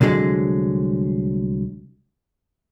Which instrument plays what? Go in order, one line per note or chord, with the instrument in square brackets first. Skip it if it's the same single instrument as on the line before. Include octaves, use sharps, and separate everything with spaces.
[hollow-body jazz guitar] C2 D3 F#3 G#3